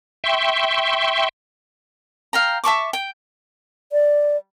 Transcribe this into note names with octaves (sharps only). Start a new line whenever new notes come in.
E5 G5 C6 C#6
F5 G5 A#5
E5 A5 C#6 D6
G5
D5